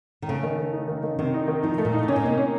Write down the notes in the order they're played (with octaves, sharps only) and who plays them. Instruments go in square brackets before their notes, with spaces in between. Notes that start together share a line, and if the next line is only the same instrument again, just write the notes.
[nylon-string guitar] D#3
[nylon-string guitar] C#3 [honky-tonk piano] A3
[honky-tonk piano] D#3
D#3
D#4
D#3
D#3
[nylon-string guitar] C3 [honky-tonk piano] D#3
[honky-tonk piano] D#4
D#3
[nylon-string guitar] F3 [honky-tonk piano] D#4
[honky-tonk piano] A3
[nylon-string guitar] A#2
[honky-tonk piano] D#4
[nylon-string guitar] C3 [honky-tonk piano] C#4
[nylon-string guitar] A#2
[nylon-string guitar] C3 [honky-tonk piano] A#3
[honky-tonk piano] C#4